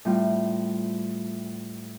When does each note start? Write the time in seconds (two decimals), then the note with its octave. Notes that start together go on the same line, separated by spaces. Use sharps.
0.05 A2 G3 C4 F4